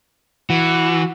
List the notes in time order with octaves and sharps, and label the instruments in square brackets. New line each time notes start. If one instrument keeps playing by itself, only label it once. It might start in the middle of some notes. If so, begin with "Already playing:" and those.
[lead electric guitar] E3 [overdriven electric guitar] F#4